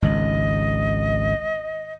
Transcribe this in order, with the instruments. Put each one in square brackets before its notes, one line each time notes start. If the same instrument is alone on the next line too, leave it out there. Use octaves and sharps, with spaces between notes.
[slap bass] G#1 C#2 [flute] D#5